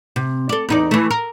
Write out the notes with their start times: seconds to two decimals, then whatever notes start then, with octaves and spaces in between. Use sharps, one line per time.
0.16 C3
0.49 A4 D5
0.69 E2 D#4 D5
0.91 E3 A3
1.11 A#4